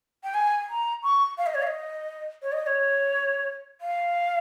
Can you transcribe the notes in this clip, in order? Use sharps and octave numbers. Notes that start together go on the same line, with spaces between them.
G5
G#5
A#5
C#6
F5
D#5
C#5
F5
D#5
C#5
D#5
D#5
C#5
F5